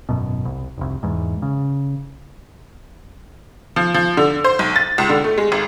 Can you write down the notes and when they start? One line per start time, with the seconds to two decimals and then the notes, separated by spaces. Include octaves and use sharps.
0.09 G#1 F#2 B2
0.45 C2
0.78 F1 C2
1.03 E2 G#2
1.42 C#3
3.76 F3
3.94 F3
4.17 D3
4.44 C5
4.59 B1
4.76 A6
4.98 C#2
5.09 D3
5.24 A3
5.38 G#3
5.52 G#1